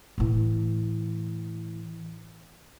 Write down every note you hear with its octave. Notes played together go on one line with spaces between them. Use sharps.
A2 E3